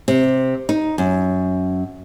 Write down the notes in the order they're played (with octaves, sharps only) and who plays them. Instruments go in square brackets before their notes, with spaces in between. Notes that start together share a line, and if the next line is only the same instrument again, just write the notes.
[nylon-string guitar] C3
D#4
F#2